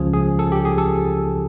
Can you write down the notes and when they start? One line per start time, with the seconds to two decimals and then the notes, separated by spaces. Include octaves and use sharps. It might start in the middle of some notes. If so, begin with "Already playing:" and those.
Already playing: C#2 C#3 F3 G#4
0.14 G#4
0.39 A4
0.52 G4
0.65 G#4
0.78 A4